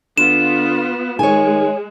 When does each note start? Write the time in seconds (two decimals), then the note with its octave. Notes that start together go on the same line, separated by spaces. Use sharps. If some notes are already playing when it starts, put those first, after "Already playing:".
0.18 D3 B3 F4 E7
1.19 D#3 G#3 C#5 G#5